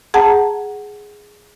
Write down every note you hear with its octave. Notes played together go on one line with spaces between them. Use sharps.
G#4 F#5 A5 A#5